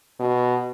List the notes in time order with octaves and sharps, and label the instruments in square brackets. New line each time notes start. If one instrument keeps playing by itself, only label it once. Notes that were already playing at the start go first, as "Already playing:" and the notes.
[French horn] B2